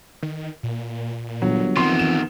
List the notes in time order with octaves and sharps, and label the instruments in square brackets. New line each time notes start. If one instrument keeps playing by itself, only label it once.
[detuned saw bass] D#3
A#2
[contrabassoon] G1 [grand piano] F#3
[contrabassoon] F2 [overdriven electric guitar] D#3 B3 [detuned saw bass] E3 [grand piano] C6
[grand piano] E7